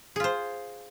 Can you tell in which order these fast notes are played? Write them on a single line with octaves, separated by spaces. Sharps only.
G#4 F4 C5